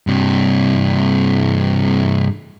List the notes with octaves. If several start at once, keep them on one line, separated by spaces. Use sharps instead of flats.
G2 C3